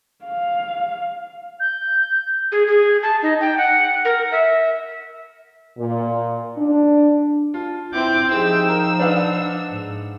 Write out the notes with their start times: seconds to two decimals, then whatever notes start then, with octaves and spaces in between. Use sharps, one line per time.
0.25 F5
1.60 G6
2.52 G#4
2.68 G#4
3.03 A5
3.22 D#4
3.40 G5
3.58 F#5
4.05 A#4
4.32 E5
5.79 A#2
6.57 D4
7.54 F4 A5
7.93 C4 E4 D6 G6
8.31 F3 D#4 G4 G#4 E6
8.68 A#4 G5
8.99 D4 B4 F5 F#5
9.70 G#2